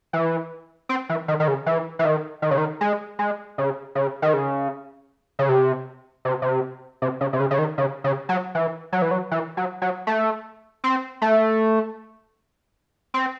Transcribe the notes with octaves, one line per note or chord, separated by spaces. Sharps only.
E3
C4
E3
D#3
D#3
C#3
E3
E3
D#3
D#3
C#3
D#3
G#3
G#3
C#3
C#3
D#3
C#3
C#3
C3
C3
C3
C3
C#3
C3
C#3
C#3
D#3
C#3
C#3
F#3
E3
F#3
E3
F#3
E3
F#3
F#3
A3
C4
A3
C4